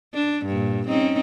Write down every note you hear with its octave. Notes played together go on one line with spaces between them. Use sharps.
D4
G2 A#2
C4 C#4 D#4